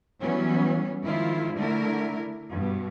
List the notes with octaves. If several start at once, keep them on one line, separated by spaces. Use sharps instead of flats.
E3 F#3 G3 B3 C#4
D#3 F3 G#3 E4 F4
D3 A3 E4 A#4
G2 B2